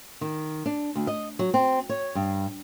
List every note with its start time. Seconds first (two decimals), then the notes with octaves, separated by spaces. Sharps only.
0.21 D#3
0.66 D4
0.96 D2
1.07 D#5
1.39 F#3
1.54 C4
1.89 C#5
2.15 G2